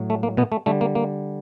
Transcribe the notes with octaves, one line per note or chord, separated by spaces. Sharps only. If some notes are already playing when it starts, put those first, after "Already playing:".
Already playing: A2 F#3
A3
A#3
B2 B3
A3
D3 G3 A3
A#3
A#3